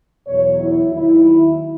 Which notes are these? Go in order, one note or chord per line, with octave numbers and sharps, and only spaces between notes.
E2 B2 F#3 C#5
E4
D#2 D#3 F#3 E4